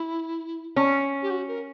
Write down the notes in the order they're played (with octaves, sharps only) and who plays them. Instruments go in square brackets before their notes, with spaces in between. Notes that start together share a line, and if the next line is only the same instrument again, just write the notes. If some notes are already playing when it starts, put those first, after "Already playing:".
Already playing: [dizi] E4
[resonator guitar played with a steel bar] C#4
[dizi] G4
F#4
A#4